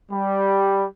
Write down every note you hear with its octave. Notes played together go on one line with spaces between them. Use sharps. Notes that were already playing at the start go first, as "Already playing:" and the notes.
G3